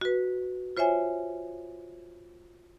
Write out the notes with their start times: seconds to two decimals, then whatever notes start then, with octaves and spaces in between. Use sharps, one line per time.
0.01 F#4 B4
0.77 F4 C5 C#5 E5 G#5